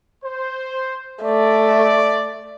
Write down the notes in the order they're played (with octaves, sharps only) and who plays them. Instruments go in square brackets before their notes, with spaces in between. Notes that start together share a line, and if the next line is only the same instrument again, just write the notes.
[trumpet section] C5
[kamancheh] A3 [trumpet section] D5